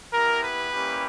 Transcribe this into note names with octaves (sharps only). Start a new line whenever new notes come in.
B3 E4 G4 A#4
B4
G3 A#3 C#4 E4 G4